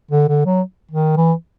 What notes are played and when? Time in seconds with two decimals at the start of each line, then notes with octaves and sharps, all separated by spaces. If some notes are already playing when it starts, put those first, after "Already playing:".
0.11 D3
0.28 D3
0.46 F#3
0.91 D#3
1.17 E3